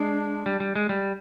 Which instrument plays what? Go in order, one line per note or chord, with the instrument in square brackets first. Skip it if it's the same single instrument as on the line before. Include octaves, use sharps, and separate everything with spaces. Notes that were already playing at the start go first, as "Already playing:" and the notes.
Already playing: [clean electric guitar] G#3 [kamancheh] D4
[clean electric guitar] G3
G3
G#3
G3